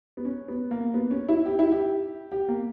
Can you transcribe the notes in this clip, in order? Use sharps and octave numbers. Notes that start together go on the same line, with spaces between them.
B3
C#4
B3
A#3
B3
C#4
E4
G4
E4
G4
G4
A#3